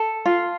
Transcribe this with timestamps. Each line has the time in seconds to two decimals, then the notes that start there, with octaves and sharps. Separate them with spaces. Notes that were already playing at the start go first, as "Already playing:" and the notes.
Already playing: A4
0.26 F4